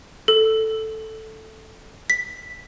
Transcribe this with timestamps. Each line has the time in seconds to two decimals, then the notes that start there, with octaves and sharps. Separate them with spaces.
0.28 A4
2.10 B6